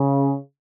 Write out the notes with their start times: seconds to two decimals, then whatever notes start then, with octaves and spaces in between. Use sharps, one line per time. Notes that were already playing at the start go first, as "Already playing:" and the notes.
Already playing: C#3